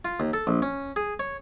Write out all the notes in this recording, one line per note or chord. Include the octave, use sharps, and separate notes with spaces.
F4
D#2
A4
A#1
C#4
G#4
C#5